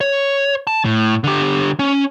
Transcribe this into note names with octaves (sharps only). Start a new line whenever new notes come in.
C#5
A5
A2
D3 G4
C#4